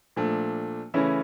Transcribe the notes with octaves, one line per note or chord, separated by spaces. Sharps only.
A#2 F3 A3 D4
C#3 E3 A3 C#4 E4